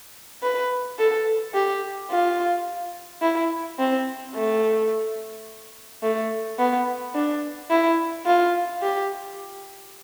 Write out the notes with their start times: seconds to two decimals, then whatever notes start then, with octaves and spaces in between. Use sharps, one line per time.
0.43 B4
0.99 A4
1.54 G4
2.11 F4
3.22 E4
3.79 C4
4.35 A3
6.03 A3
6.59 B3
7.15 D4
7.71 E4
8.26 F4
8.83 G4